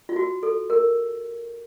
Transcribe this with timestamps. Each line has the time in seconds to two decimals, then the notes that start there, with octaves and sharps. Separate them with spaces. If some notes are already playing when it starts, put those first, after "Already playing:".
0.09 F4
0.16 F#4
0.43 A4
0.70 A#4